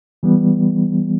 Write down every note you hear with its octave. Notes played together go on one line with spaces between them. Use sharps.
E3 G3 B3